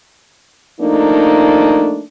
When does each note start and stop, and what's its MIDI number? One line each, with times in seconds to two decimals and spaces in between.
0.80 2.01 53
0.80 2.01 57
0.80 2.01 58
0.80 2.01 62
0.80 2.01 63